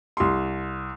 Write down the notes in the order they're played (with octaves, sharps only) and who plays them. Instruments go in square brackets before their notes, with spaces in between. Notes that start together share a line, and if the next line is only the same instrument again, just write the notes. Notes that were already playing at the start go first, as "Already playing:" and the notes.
[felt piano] C2 C6